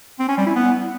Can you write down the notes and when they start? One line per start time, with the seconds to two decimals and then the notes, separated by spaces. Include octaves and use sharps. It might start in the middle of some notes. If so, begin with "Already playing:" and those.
0.19 C4
0.28 C#4
0.37 G3
0.46 E4
0.55 B3